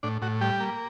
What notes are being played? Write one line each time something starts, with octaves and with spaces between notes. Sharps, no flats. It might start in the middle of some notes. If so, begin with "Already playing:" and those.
A2 D4
A2 F#4
G3 G4
A#3